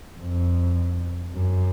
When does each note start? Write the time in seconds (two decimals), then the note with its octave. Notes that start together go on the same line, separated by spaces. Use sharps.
0.20 F2
1.34 F#2